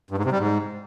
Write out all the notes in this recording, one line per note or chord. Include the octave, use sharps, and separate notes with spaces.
G2
G#2
C3
G3
G#2